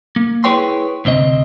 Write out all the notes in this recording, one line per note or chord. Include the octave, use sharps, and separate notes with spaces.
A#3
E4 G#4 B4 C#5 G5 C6
D2 C3 C4 D#5